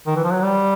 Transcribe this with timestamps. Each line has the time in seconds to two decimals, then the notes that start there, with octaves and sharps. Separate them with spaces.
0.07 D#3
0.16 E3
0.24 F3
0.33 F#3
0.42 G3